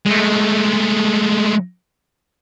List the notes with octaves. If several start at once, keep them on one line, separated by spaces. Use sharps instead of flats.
G#3 A3